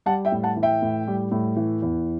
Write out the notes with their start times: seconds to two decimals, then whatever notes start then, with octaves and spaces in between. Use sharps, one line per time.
0.06 G3 F#5 A5
0.25 E5 G5
0.32 A2
0.44 F#5 A5
0.56 E3
0.63 E5 G5
0.82 A2
1.07 G3
1.31 A2
1.56 E3
1.82 E2